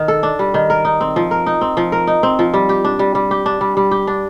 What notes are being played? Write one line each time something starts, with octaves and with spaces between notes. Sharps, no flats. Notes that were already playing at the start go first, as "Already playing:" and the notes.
Already playing: D#3
A4
D4
G3
D#3
A#4
D#4
C4
F3
A#4
D#4
C4
F3
A#4
D#4
C4
F3
G3
G4
D4
G3
G3
G4
D4
G3
G3
G4
D4